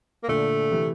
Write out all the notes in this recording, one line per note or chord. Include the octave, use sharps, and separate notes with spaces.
A#3
A#2 D3 A3
C3 E3